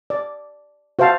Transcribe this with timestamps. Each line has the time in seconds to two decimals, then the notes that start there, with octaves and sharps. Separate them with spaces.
0.10 D5
0.99 F#4 C5 E5 F5 A5